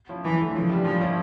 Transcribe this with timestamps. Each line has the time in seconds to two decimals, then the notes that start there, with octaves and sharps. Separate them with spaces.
0.09 F3 C#4 E4
0.24 E2 E3
0.39 D3 A3
0.54 C#3 F3
0.69 G3 D4
0.84 A#2 F3
1.01 F3 C#4 E4